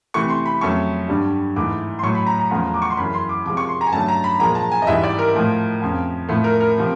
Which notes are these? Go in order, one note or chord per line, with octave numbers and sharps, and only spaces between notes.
C3 E3 A3 C#6
C6
B5
F2 C#3 F#3 A3 C#6
G2 D3 G3
G#2 E3 A3 D6
C6
A2 F#3 A3 C#6
B5
A#5
A#5
E2 C#3 F3 A3
D6
C#6
C6
F#2 C#3 E3 B5
C6
D6
C3 F3 G#3 D6
C#6
C6
A#5
G#5
G2 D3 F#3 A3 A5
A#5
B5
A#2 F3 G#3 A#5
A5
G#5
D#5
G#2 E3 G3 E5
D5
A#4
A2 F3 A3
F2 C#3 F3
A2 F3 A3
A#4
A#4
C3 F3